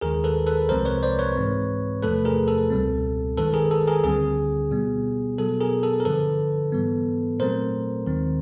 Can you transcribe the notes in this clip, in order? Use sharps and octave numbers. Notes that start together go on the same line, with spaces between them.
D#2 D#3 G#3 G#4 A#4
A4 B4
A4 B4
C2 C3 F3 G#3 C4 A#4 C5
B4 C#5
C5 D5
B4 C#5
G#2 E3 G#3 C4
E2 C3 F3 A3 A4 B4
G#4 A#4
A4
C#2 B2 G3 C4
G2 D#3 G#3 A4 B4
G#4 A#4
A4
G#4 A#4
D2 D3 G3 C4 G#4
B2 G3 B3
B2 F#3 B3 A4
G#4 A#4
A4
A#4
G2 D3 F3 A4 B4
G#2 E3 G3 B3
A#2 F#3 A3 C4 A#4 C5
D#2 D#3 G#3 C4